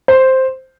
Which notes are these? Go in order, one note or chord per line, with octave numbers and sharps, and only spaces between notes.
C5